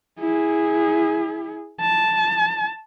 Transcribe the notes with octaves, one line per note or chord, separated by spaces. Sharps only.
E4 G#4
A5